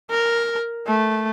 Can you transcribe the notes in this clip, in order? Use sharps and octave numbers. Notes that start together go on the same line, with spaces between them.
A#4
A3